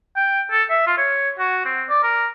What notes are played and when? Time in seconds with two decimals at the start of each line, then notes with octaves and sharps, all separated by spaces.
0.16 G5
0.51 A4
0.70 E5
0.87 F4
0.98 C#5
1.39 F#4
1.65 C4
1.89 D5
2.03 A#4